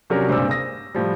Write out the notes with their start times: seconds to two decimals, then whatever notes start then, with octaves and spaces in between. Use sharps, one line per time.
0.10 C3 F#3 C#4 D4 A#4
0.29 C#2 G2 A#2 C4 D6 E6
0.50 D#6 A#6
0.95 A2 F3 G3